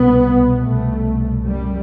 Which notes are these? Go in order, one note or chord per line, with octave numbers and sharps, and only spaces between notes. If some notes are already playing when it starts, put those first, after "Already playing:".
Already playing: C2 B2 B3
C2 B2 A3
F#2 G3